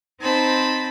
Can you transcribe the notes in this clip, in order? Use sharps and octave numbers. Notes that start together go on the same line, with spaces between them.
C4 D#4 C5 A5 B5